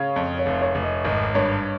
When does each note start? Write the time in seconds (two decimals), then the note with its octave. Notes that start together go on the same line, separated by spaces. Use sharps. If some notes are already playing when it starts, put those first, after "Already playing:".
Already playing: C#3 C#5 F5
0.16 F2
0.38 C#5
0.46 F1
0.61 C#5
0.75 F1
0.83 D#5
1.05 G#1 D#5
1.35 G2 C#5